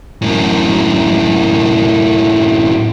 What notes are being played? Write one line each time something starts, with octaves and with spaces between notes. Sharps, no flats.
F#2 A2